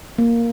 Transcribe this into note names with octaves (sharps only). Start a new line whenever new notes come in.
A#3